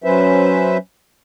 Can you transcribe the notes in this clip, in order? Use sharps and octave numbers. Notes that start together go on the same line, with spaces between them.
F#3 C#4 B4 C5 E5